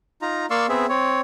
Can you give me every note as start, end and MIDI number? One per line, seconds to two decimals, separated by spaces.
0.22 0.46 63
0.22 0.46 65
0.22 0.46 82
0.50 0.66 58
0.50 0.66 74
0.50 0.66 77
0.50 0.66 84
0.50 0.66 85
0.50 0.66 88
0.69 0.86 59
0.69 0.86 60
0.69 0.86 68
0.69 0.86 76
0.89 1.21 60
0.89 1.21 73